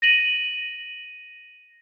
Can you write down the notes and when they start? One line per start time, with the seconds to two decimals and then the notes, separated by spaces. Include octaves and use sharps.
0.02 A#6 D#7 F#7